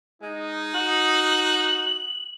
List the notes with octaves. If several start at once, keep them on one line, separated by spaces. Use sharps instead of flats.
G#3 D#4
F#4 F#7